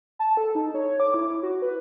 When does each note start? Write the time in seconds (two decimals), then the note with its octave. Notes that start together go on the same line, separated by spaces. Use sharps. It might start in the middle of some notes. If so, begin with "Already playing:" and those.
0.19 A5
0.37 A4
0.55 D#4
0.74 C#5
1.00 D6
1.14 E4
1.43 F#4
1.62 B4